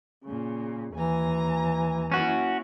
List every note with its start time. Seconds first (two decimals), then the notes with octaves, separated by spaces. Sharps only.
0.25 A#2 C#3
0.94 D#2 E3 G#5 A#5
2.12 A#3 C#4 E4 F#4